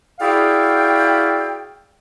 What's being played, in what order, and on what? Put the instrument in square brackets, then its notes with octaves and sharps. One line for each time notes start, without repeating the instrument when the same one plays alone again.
[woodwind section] E4 F#4 G#4 D5 F5 G5